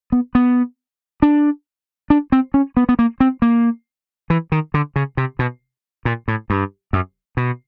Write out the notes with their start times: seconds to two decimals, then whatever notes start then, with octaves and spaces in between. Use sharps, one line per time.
0.12 B3
0.35 B3
1.22 D4
2.10 D4
2.32 C4
2.54 C#4
2.77 B3
2.89 B3
2.99 A#3
3.20 C4
3.42 A#3
4.30 E3
4.52 D#3
4.74 D3
4.96 C#3
5.17 C3
5.39 B2
6.05 A#2
6.28 A2
6.50 G2
6.93 F#2
7.37 B2